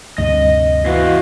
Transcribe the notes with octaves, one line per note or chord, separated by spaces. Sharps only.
D2 G2 C3 D#5
E3 B3 F#4 D#5 F5